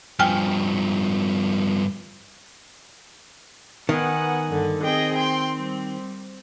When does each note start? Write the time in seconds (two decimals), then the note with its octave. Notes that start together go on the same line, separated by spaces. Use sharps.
0.19 G2 F3 G5 G#5 F6
3.89 D#3 B3 F#5 G#5
4.47 G2 D3
4.83 C4 G#4 D#5 G5
5.15 G5 C6
5.55 G3